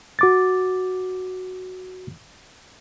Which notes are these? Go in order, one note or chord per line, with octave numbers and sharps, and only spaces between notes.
F#4 D6 A6